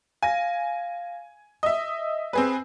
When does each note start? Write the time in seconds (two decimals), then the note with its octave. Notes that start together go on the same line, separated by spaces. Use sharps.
0.23 F5 G#5 A#6
1.63 D#5 E5 D#6
2.33 C4 G#4 B4